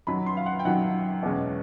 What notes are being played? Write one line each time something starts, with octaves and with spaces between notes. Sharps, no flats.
F#2 D#3 F#3 B5
C6
F5
F#5
G5
F#2 D#3 F#3 F#5
E2 B2 G#3 C#4